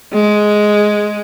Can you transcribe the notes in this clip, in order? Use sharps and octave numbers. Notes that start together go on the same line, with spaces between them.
G#3